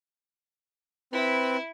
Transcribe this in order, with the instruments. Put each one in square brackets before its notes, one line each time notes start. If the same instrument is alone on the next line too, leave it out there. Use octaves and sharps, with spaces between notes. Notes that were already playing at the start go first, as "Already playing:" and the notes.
[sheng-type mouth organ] C4 B4 [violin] E4